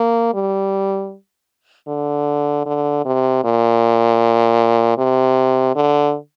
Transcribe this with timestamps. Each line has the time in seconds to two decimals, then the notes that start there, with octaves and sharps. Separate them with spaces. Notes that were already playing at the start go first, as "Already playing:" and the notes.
Already playing: A#3
0.34 G3
1.88 D3
2.66 D3
3.05 C3
3.44 A#2
4.98 C3
5.75 D3